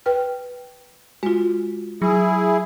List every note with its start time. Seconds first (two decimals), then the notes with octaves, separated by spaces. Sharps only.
0.06 B4 G5 F6
1.23 G#3 F4 F#4
2.02 F#3 E4 G#4